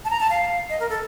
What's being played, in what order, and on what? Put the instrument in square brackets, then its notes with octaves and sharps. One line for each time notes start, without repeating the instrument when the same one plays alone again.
[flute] A5
A#5
A5
F5
D#5
A#4
A4